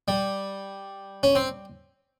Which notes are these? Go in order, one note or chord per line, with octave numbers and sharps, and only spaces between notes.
G3
C#4
C4